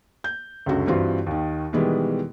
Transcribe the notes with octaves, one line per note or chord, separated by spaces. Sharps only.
G6
C#2 F#2 D3 F#4
G2 E3 C4 F4 F#4
D#2 D#3
B2 D#3 E3 G3 G#3 B3